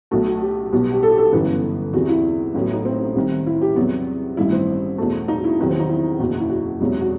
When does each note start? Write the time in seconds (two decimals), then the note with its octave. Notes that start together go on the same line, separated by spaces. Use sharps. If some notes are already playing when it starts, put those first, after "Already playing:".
0.11 B1 B2 A3 F#4
0.26 F#4
0.42 G4
0.73 B1 B2 G3 B3
0.93 G4
1.03 A4
1.11 G4
1.18 A4
1.33 G1 F#2 E3 B3 B4
1.93 E2 C3 E3 F#4
2.09 E4
2.54 A1 A2 F#3 B3
2.73 D#4
2.85 C4
3.15 C2 C3 D#3
3.47 E4
3.62 G4
3.76 E2 C3 F#3 B3 F#4
4.37 A1 G2 D#3 E4
4.52 C4
4.98 E2 B2 A3
5.28 D#4
5.39 F#4
5.44 E4
5.59 E2 C3 D#3 F#3 B3
5.69 C4
5.80 D#4
5.89 E4
6.20 F#1 E2 B2
6.40 E4
6.50 F#4
6.80 E1 E2 C3 F#3
7.01 F#4